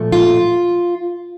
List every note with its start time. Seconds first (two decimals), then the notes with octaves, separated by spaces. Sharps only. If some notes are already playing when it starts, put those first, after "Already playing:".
Already playing: A#2 F3 A3
0.12 F4